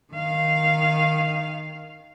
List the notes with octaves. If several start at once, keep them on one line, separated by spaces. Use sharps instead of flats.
D#3 F5